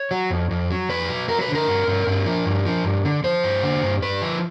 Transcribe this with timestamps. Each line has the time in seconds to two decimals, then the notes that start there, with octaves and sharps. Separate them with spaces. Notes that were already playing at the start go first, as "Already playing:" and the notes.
Already playing: C#5
0.11 F#3
0.30 F2
0.51 F2
0.70 F#3
0.89 F2 B4
1.09 F#3
1.28 F#3 A#4
1.41 B4
1.48 D3
1.55 A#4
1.68 G2
1.87 G2
2.07 G2
2.26 F3
2.46 G2
2.66 F3
2.85 G2
3.04 D3
3.24 F3 C5
3.44 G2
3.63 D3
3.83 G2
4.02 G2 B4
4.22 F3